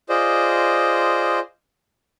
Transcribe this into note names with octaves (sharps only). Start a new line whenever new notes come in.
F4 G#4 C5 D5 D#5